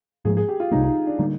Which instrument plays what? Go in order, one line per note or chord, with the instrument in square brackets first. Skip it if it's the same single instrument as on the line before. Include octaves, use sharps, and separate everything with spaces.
[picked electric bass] G#2 F3 A#3 [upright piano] G#4
[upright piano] G#4
G4
F4
[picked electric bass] C2 C3 G3 A#3 [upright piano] D#4
[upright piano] D#4
D4
[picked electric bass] D3 G3 A#3 [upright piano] D#4